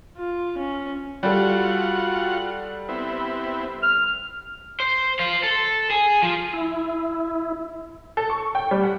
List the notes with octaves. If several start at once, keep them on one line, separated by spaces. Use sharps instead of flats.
F4
C#4
G3 F4 F#4 A4 F#5
B3 C4 E4
F6
C5
C5 F5
A4
G#4
F3
E4
A4
C#6
G5
G3
F#5